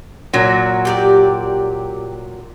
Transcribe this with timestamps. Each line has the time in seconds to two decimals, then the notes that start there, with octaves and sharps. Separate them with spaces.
0.33 A#2 F#3 A#4
0.85 G4 G#4 D5